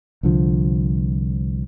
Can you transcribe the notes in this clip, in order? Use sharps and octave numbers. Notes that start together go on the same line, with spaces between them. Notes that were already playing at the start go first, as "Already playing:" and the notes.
C2 D3 F3